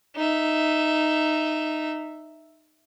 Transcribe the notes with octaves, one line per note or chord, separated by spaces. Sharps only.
D#4 E5